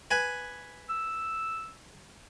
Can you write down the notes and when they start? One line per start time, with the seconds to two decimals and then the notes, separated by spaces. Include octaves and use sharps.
0.11 B4 G#5
0.89 E6